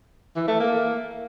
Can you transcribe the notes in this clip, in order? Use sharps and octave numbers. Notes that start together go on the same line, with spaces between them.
E3
A3
A#3